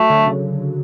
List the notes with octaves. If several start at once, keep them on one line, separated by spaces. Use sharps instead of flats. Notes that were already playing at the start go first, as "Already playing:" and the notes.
Already playing: F#3 A3
D3
C#3